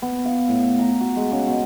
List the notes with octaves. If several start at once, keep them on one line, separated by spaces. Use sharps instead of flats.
B3
F5
A2
A#5
F#4
G#3
C#3
B2